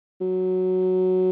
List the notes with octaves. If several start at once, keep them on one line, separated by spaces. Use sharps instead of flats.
F#3